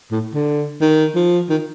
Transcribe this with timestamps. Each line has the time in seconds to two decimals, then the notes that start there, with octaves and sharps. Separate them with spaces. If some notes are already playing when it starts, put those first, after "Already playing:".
0.11 A2
0.34 D3
0.81 D#3
1.15 F3
1.49 D#3